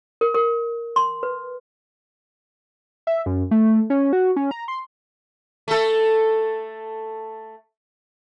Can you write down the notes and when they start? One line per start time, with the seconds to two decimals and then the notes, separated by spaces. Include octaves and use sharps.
0.21 A#4
0.35 A#4
0.96 C6
1.23 B4
3.07 E5
3.26 F#2
3.51 A3
3.90 C#4
4.13 F#4
4.36 C#4
4.51 A#5
4.68 C6
5.68 A3 A4